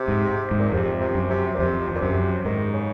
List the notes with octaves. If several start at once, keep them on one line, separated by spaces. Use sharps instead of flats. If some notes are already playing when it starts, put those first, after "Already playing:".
Already playing: C3
G#2
G#2
A#2
F2 C3
C3
F#2
C3
A#2
F2 C3
F2 A#2
F#2 C3
G#2 D#3
C#3